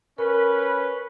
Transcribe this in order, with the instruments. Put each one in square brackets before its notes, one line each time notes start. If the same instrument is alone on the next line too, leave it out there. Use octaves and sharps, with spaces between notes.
[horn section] C#4 B4 [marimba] A#4